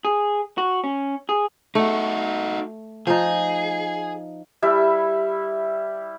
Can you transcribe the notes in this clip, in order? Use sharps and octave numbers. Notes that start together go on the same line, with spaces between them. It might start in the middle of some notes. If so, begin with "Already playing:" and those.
G#4
F#4
C#4
G#4
A3 D#4 F#4
F3 D#4 G#4
G3 E4 E5